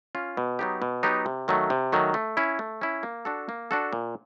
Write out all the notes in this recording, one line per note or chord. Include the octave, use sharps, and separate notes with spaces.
C#4 F4
B2
F#3 B3 D#4 G4
B2
F#3 B3 D#4 G4
C3
D#3 F#3 A3
C3
D#3 F#3 A3
A3
C#4 E4
A3
C#4 E4
A#3
D4 F#4 A4
A#3
D4 F#4 A4
A#2